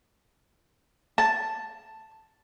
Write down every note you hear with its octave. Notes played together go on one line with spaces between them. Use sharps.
A5